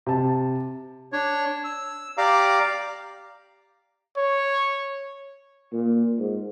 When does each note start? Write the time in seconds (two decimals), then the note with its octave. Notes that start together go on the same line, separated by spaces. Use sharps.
0.06 C3 A5
1.12 D4 C#5
1.64 E6
2.18 G4 D5 F5 A#5 D6
4.17 C#5
5.72 A#2
6.19 G#2